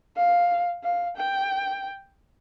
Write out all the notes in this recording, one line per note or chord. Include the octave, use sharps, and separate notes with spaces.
F5
F5
G5